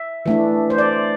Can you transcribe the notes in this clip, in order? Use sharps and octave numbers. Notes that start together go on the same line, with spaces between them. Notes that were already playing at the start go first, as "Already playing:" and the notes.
Already playing: E5
E3 A3 D4
C5
D5